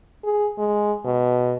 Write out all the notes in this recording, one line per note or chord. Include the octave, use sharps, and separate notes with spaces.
G#4
G#3
B2